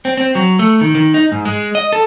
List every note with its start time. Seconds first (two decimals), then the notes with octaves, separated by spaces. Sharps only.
0.05 C4
0.17 C4
0.35 F#3
0.59 A3
0.81 D#3
0.95 D#3
1.14 D#4
1.32 G#2
1.45 G#3
1.75 D#5
1.93 A4